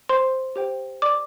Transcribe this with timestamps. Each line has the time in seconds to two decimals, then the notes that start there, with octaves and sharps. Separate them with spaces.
0.09 C5 C6
0.56 G4 C5 G5
1.02 D5 D6